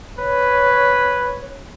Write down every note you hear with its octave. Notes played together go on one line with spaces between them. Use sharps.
B4 C#5